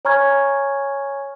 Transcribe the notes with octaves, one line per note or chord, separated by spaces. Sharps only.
C#5 G#5 A#5 C#6 F6 G#6